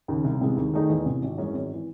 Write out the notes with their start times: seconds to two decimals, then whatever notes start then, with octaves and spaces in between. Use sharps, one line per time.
0.08 D#2 C#3
0.24 C2
0.41 C3 E3 G#3
0.57 D#2
0.74 D#3 A3 D#4 G#4
0.89 E2
1.06 C3 E3
1.22 G#1
1.38 F#2 E3 G#3 C#4
1.54 G#1
1.74 E3